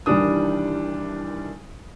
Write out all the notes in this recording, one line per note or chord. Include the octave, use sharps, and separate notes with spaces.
C2 D#3 E3 G3 D4 D#6